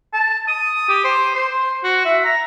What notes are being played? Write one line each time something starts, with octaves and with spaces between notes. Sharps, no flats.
A5
D#6
G4
C5
C5
F#4
E5
A#5